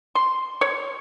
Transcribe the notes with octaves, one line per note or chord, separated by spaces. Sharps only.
C6
C#5